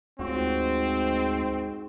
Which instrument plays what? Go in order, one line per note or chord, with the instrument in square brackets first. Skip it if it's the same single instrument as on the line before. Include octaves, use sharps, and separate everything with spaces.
[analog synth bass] D2 [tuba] G#2 [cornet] C4 [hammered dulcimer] F#4